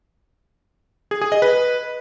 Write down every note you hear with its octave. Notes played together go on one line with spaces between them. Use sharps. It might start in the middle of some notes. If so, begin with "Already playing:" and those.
G#4
G#4
D#5
B4